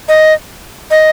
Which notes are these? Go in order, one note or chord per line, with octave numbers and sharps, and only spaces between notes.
D#5
D#5